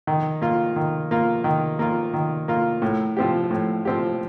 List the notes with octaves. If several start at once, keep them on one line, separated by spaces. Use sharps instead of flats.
D#3
A#3 F4
D#3
A#3 F4
D#3
A#3 F4
D#3
A#3 F4
A2
F3 C4 G4
A2
F3 C4 G4